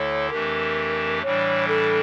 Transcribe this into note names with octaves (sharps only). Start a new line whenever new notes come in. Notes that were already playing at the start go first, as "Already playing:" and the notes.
Already playing: D2 D3 A3 E4 A4 C#5
F2 E3 A3 D4 G4 A#4
A2 E3 G3 D4 C#5
A4